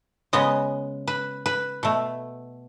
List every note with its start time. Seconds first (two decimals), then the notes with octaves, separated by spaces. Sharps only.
0.33 C#3 G#3 B3 D#5
1.08 B4
1.46 B4
1.83 B2 A3